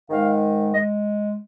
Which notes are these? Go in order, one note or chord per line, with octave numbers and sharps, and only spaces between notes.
G#2 D#3 G#3 F5
G#3 D#5